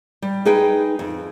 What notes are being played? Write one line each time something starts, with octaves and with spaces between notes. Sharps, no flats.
G3
D#4 G#4 B4 G5
F2